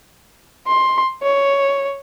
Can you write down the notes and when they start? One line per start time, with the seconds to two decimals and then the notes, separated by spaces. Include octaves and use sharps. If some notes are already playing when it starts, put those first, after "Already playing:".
0.67 C6
1.22 C#5